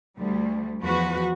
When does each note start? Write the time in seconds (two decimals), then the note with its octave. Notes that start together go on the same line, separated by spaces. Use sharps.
0.19 D2 G3
0.81 E2 F3 F#4 B4